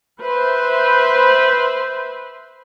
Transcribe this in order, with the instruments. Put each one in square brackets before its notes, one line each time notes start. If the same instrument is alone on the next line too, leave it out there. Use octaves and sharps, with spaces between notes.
[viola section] B4 C5 E5